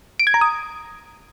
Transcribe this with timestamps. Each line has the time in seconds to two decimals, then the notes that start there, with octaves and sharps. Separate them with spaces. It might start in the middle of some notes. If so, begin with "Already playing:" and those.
0.20 D7
0.27 G#6
0.34 A#5
0.41 D#6